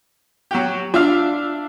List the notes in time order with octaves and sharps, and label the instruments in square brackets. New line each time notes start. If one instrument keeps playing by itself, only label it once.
[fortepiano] F#3 F#4 G4
[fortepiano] D4 E5 F5 [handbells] F4